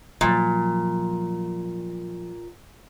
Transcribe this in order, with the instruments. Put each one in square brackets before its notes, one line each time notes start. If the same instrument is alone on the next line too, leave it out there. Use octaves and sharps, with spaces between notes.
[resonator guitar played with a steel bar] A#2 [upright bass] F3 F#3